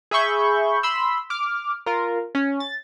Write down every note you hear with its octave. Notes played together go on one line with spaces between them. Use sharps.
G#4 E5 B5 C#6 G6
B5 C6 E6
D6 F6
F4 A#4
C#4
A6